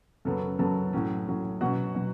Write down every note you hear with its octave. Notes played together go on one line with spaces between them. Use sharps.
F#2 C#3 F#3 B3 A4
F#2 C#3 F#3 B3 A4 A5
A2 F#3 C#4
A2 F#3 C#4
B2 F#3 C#4 F#4 F#5
B2 F#3